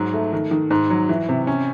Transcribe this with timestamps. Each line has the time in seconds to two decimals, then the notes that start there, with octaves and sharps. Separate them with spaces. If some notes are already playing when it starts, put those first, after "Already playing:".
Already playing: G#2 F#3
0.13 A3
0.33 D#3
0.51 D#3
0.71 G#2
0.90 F#3
1.09 E3
1.29 C3
1.47 C#4